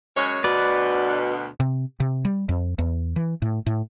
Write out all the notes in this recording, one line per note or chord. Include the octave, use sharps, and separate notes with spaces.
F#2 G#3 C#5
D2 B2 B4 D5
C3
C3
G3
F2
E2
E3
A2
A2